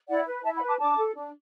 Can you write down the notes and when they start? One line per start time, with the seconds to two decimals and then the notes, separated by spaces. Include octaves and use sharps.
0.08 E4 D5 F#5
0.26 B4
0.43 E4 E5 A5
0.56 F#5 B5
0.61 B4
0.68 A5 D6
0.78 D4 A5 D6
0.97 A4
1.15 D4